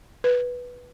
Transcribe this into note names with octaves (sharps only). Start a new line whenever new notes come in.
B4